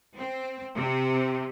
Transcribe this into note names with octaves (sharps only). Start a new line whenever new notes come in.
C4
C3